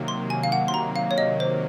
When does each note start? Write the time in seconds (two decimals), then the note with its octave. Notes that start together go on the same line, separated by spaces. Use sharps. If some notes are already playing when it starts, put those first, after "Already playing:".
Already playing: C3 D#3 F#3 A#3
0.08 C6
0.30 G#5
0.44 F5
0.52 F#5
0.68 C6
0.74 A#5
0.96 F5
1.11 C#5
1.18 D#5
1.40 C5